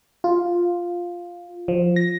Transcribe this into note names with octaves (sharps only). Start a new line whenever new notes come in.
F4
F3
A#6